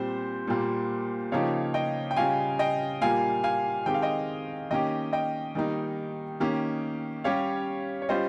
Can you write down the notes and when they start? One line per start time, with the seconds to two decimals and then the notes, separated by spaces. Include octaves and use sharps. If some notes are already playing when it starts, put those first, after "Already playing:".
Already playing: A#2 G3 C4 C5
0.47 A#2 G3 A#3
1.32 C#3 F3 A#3 D#4 G4 C#5 F5
1.74 D#5 G5
2.11 G5
2.17 C#3 G3 C#4 F4 F5 G#5
2.59 D#5 G5
3.01 A#2 G3 A#3 F4 F5 G#5
3.44 F5 G#5
3.86 D#3 G#3 C4 G4 G5
3.94 F5
4.02 D#5 G5
4.71 D#3 A#3 C#4 G4 D#5 G5
5.13 D#5 G5
5.55 D#3 G3 A#3 D#4
6.40 D#3 A#3 C#4 G4
7.24 G3 C#4 G4 C#5 F5
8.02 C#5
8.09 G3 C#4 F4 C5 D#5